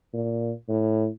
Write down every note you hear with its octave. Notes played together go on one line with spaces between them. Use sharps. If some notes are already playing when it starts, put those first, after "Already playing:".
A#2
A2